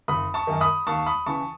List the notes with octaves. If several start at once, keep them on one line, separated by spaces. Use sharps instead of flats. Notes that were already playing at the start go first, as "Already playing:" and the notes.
F#1 B5 D#6
A5 C#6
F#2 D#3
B5 D#6
D#2 A5 C#6
B5 D#6
C#3 E3 A5 C#6